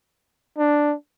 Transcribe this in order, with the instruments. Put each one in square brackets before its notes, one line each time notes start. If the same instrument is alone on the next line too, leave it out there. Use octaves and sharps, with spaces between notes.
[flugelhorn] D4